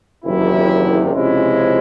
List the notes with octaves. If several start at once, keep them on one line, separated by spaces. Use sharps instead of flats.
F#1 E2 C3 D#3 F#3 E4
C#2 C3 F3 G#3 C#4 E4